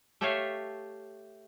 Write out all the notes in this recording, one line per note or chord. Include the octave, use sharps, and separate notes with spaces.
A3 G4 A4 C#5 E5 F5